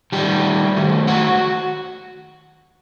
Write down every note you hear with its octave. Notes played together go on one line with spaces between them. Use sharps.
D#3 G3 A3 G4
D#3 F#3 A3
F#4 F#5